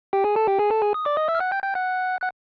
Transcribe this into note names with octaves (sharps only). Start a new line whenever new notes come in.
G4 G5
G#4 G#5
A4 A5
G4 G5
G#4 G#5
A4 A5
G#4 G#5
D#6
D5 D6
D#5 D#6
E5 E6
F6
F#5 F#6
G5 G6
G5 G6
F#5 F#6
F#5 F#6